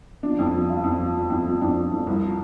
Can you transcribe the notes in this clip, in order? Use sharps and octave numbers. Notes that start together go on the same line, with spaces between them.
F3 D4
F2
F3
F3 F4
F2
F3
F3
F2
F3
F2 D4
F3
F2
C2
F3